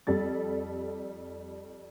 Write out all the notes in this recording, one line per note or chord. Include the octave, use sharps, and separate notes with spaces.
F2 G3 A4 A6